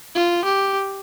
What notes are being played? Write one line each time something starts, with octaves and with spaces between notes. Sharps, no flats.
F4
G4